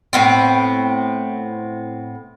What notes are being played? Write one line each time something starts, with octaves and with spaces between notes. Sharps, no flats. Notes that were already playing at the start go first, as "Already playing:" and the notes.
A2 B3 C4